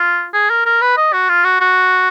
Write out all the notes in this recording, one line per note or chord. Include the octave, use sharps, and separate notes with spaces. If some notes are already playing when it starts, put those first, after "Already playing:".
Already playing: F4
G#4
A#4
A#4
B4
D#5
F#4
F4
F#4
F#4